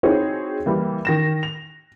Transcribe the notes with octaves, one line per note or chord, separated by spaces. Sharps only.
C4 D#4 E4 F#4 G#4 C#5
E3 G3 A#3
D#3 A#6 E7
F7